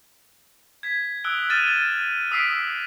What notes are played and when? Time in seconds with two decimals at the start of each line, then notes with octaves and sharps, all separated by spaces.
0.83 G#6 B6
1.24 D#6 E6 F#6 D7 G7
1.49 D#6 F6 A6 D#7 E7
2.31 D#6 E6 B6 C7 D7